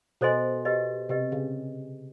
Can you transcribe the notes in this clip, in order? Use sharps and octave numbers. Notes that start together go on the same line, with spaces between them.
B2 A4 C5 D#5 G#5 C6
G4 B4 D#5
C3 G4 B4 D#5
C#3